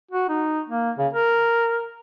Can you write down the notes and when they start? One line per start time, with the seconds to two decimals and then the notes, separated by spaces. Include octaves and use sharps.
0.11 F#4
0.29 D#4
0.69 A#3
0.98 C#3
1.13 A#4